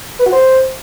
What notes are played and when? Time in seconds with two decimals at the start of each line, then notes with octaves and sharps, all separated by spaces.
0.20 B4
0.26 F#4
0.32 C5